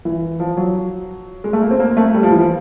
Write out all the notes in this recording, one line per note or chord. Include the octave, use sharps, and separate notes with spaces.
E3
F3
F#3
G#3
A3
A#3
C4
A#3
A3
G3
F3
E3
F3